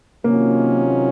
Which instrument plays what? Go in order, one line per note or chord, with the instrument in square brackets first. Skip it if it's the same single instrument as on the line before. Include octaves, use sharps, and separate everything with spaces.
[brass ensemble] C3 D#3 F#3 C#4 F4 [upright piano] A#3